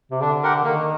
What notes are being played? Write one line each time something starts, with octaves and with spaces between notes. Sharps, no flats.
C3
D3 D4
G4 A#4 F#5
D#3 A#3